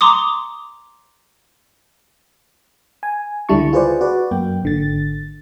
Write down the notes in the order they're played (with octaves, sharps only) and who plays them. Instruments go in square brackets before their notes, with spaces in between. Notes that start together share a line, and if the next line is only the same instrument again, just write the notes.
[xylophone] A#5 C6 D6 D#6
[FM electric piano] G#5
C#2 D3 G3 E4 A5 C#6
F4 G#4 B4 C5 D5
F#4 B4 D5
F#2 A#3 G5
G#1 D3 A6